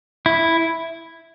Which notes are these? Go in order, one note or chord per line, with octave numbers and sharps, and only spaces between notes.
E4